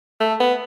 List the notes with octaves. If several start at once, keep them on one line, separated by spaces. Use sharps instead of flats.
A3
B3